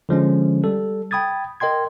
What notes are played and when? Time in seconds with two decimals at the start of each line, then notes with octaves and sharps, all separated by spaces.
0.09 D3 F3 G#3 C#4
0.64 G3 A4
1.11 G5 B5 D#6 G#6 A6
1.60 A#4 D#5 G5 C6 G#6